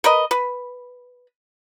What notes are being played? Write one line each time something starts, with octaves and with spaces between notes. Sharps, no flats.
A#4 B4 D#5
B4